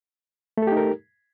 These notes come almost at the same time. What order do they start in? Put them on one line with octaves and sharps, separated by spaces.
A3 A4 G4 D#4 A#4